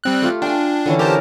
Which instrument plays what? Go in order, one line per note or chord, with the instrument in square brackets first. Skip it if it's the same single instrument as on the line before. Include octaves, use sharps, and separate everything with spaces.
[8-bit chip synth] G3 C4 F#6
[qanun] A3 F4 G4
[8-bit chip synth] D4 [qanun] G5 G#5
[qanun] D3 E3 C#4
[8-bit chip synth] G4 C5 A5 [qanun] A#4